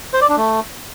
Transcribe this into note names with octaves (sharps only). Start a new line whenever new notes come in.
C5
D5
D4
A3